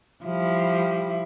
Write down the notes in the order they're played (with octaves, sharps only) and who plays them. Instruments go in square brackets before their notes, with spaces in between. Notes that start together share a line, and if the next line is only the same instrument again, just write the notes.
[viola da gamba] F3 G3 E4